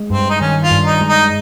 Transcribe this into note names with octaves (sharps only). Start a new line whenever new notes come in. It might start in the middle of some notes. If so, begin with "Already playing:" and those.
Already playing: G#3
G2 C4
D#4
D#3 C#4
F4
G2
D#4
G#3
D#4